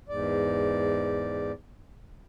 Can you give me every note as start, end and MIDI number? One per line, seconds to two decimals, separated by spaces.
0.09 1.52 40
0.09 1.52 44
0.09 1.52 74